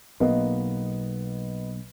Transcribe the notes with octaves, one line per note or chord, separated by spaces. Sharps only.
B1 A#3 B3 D#5